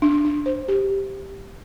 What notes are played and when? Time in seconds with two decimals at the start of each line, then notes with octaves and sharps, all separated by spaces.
0.02 D4
0.25 D4
0.46 C5
0.68 G4